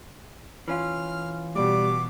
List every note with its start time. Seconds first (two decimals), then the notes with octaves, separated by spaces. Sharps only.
0.68 E3 C#4 F4 F6
1.55 B2 G3 D6